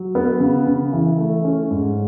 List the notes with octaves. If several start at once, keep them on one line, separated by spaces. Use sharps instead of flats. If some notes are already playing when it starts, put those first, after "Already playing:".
Already playing: F#3
B3
C#3
C#3
E3
A3
C#4
G#2